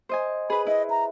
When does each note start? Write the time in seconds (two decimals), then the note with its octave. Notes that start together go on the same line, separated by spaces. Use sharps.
0.09 C5 D#5 G#5
0.50 G#4 B4 B5
0.67 E4 D#5
0.90 A#5